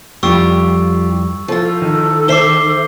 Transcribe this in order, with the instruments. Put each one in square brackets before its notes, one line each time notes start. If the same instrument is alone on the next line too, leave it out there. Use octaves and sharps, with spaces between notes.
[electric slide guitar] F2 G3 [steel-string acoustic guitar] F4 G4 [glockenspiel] C#6 E6
[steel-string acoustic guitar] F3 F4 [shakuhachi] A4
[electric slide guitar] D#3
[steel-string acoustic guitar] C5 E5 [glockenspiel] D6 C7 G7